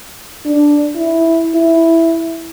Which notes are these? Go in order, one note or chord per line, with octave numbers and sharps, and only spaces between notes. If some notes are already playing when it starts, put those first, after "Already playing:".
D4
E4
E4